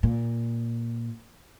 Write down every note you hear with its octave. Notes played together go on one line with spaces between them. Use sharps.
A#2